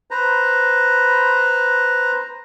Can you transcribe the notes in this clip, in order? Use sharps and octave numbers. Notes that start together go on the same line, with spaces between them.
B4 C5 A#5